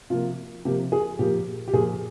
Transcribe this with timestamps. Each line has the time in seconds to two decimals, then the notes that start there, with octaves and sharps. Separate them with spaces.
0.10 C3 F3 A#3 F4
0.65 C3 F3 A#3 G4
0.92 G#4
1.19 A#2 F3 A#3 G4
1.68 G4
1.73 A#2 F3 A#3 G#4